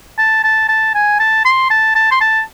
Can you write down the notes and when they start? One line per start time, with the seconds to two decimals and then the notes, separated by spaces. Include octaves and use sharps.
0.18 A5
0.44 A5
0.69 A5
0.95 G#5
1.20 A5
1.45 C6
1.71 A5
1.95 A5
2.11 C6
2.21 A5